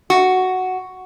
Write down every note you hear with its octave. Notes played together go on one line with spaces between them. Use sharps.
F#4